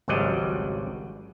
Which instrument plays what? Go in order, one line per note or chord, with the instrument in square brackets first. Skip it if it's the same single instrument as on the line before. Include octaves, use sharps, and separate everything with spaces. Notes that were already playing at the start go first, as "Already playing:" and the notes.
[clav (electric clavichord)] G#1 C#2 F#3 G3 D5 D#5